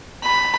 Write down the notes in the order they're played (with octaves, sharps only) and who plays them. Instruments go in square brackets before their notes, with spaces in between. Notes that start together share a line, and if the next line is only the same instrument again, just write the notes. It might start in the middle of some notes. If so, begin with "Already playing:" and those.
[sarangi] B5